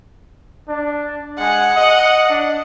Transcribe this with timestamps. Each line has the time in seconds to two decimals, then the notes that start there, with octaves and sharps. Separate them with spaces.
0.68 D4
1.39 G#3 F#5
1.77 D#5
2.30 D4